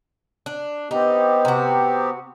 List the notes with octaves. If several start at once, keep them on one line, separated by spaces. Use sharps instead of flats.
D4
B3 C4 D#4 G4
C3 F#4